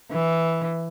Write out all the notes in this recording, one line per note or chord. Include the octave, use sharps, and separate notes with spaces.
E3